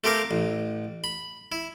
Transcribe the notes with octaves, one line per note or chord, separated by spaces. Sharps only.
A3 C4 G4 A#4 F5
A1
B5
E4